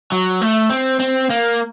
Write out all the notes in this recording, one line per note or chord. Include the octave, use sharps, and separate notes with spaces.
F#3
A3
C4
C4
A#3